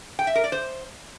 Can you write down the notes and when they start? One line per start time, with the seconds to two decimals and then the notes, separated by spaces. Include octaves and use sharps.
0.19 G5
0.27 E5
0.35 A#4
0.44 D5
0.52 C5